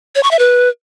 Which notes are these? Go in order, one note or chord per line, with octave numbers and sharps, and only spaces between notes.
C#5
C#6
E5
B4